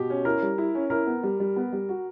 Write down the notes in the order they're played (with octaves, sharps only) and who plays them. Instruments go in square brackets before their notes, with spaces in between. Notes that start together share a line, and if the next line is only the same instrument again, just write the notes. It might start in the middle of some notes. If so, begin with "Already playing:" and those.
Already playing: [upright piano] B2 [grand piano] G4
[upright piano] C#4
[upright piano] E4 [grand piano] A#4
[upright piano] G3
E4
C#4
[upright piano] E4 [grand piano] A#4
[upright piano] B3
G3
G3
B3
G3
F#4